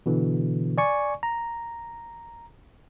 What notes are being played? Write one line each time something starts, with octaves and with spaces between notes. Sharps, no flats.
B2 D3 E3
D5 G#5 C#6
A#5